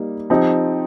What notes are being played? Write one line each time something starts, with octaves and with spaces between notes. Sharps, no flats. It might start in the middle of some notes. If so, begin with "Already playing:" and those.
Already playing: G3 A#3 D#4
F3 C4 D#4 G4